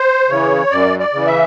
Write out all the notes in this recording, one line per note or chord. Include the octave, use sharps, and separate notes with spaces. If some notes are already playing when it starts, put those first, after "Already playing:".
Already playing: C5
C#3 E3 C#5
F#2 D5
D5
C#3 E3
E5